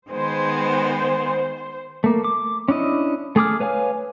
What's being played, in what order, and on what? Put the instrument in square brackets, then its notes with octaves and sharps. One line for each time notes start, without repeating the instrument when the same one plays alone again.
[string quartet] D#3 G#3 B3 [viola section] C5
[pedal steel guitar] A3 A#3
D6
C#4 D4 E4 D#5
A3 G#4 D6 F6
B4 C#5 F5 G#5